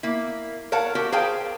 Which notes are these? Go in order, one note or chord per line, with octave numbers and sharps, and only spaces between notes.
A#3 E4
A#4 C#5 F5 F#5 A5
F#4 G4 A#4
G#4 A#4 C5 F5 G5 A5